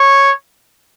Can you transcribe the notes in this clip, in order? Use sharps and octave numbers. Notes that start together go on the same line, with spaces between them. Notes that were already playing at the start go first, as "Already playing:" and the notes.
Already playing: C#5